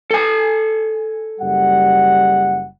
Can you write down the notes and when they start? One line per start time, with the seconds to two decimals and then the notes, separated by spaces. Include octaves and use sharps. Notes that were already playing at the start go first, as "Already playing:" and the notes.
0.11 A4 G#5
1.40 F#1 G3 F#5